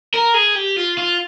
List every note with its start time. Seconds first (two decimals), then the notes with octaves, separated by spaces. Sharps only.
0.14 A#4
0.34 G#4
0.55 G4
0.76 F4
0.97 F4